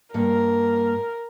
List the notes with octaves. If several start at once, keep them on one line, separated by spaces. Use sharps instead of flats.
G2 A#3 A#4